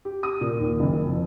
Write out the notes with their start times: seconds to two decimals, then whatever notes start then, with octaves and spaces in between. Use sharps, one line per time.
0.05 G4
0.23 D#6
0.41 A#2
0.59 D#2
0.80 F#1
1.06 F2